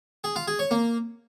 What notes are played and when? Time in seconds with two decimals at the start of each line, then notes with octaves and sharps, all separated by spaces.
0.24 G#4
0.36 F4
0.48 G#4
0.59 C#5
0.71 A#3